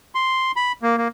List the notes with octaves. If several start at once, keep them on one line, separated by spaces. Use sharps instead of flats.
C6
B5
A#3
A#3